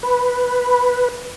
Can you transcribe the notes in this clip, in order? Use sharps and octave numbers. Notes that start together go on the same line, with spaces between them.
B4